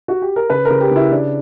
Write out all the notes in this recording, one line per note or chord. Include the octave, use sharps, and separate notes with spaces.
F#4
G4
A#4
C#3 B4
A#4
C#3
G4
C#3 E4
C#3 D4